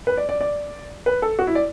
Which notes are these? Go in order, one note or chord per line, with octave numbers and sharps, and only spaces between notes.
B4
D5
D5
D5
B4
A4
F#4
E4
D5